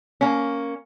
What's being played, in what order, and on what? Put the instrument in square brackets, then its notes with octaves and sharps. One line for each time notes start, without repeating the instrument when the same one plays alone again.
[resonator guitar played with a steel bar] A#3 C#4